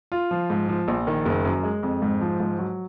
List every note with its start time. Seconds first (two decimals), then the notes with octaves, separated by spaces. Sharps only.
0.12 F4
0.31 F3
0.50 G#2
0.69 F3
0.88 A#1
1.07 D#3
1.25 F#1
1.45 F#2
1.63 G#3
1.83 F2
2.02 G#2
2.21 F3
2.40 G#2
2.59 F#3